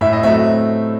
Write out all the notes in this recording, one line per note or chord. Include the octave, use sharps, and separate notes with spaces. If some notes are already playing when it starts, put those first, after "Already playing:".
A2 E5
D#5
F#3 A3 C4 E5